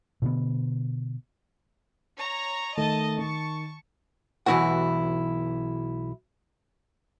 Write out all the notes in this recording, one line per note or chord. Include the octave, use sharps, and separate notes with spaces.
B2 D3 B3
C#5 A#5
D#3 A3 D#5 A5
D#3 A5 C#6
B1 E3 D4 E4 F#4 F#5